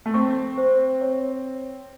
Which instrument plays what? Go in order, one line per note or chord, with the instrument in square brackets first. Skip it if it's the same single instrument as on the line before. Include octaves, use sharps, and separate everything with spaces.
[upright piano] A3
[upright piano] C4 [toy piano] C#6
[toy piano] C5
C#5